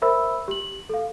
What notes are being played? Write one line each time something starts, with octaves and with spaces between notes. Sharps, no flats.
A#4 C5 E5 B5 E6
G4 F#7
A4 F5